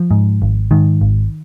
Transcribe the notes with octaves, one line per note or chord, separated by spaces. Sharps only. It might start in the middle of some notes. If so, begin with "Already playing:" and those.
Already playing: F3
G#2
G#1
G#2 D#3
G#1